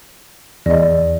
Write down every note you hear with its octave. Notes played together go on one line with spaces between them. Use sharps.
E2 D5 D#5